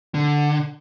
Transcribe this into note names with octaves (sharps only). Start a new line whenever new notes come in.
D3